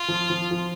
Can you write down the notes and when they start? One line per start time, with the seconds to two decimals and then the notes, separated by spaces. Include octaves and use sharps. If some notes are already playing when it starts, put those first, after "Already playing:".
Already playing: F4
0.08 F3
0.30 F3
0.51 F3